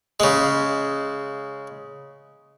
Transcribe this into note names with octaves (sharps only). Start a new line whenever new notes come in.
C#3 G#3